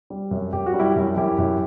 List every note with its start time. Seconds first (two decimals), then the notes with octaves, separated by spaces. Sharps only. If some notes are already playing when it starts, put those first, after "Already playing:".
0.10 G3
0.31 F#2
0.53 F#2 G4
0.66 F#4
0.74 G3
0.79 E4 G4
0.96 F#2
1.17 F#2 E4 G4
1.38 F#2